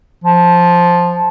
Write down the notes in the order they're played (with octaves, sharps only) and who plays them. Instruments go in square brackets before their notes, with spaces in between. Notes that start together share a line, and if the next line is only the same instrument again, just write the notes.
[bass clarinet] F3